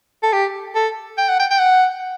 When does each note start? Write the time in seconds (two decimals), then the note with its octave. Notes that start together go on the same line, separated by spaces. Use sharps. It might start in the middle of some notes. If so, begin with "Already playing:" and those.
0.23 A4
0.33 G4
0.75 A4
1.17 G5
1.29 F#5
1.39 G5
1.50 G5
1.59 F#5